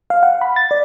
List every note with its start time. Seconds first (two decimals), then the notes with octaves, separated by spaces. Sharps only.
0.10 F5
0.23 F#5
0.41 B5
0.56 A6
0.71 D5